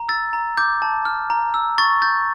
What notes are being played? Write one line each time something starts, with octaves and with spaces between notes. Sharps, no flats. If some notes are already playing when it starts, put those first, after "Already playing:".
Already playing: A#5
E6 A6
A#5
D6 G6
A5
F6
A#5
E6
C#6 A6
G6 A6